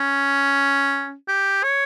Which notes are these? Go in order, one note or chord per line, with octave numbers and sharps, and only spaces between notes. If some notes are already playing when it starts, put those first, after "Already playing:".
Already playing: C#4
G4
C#5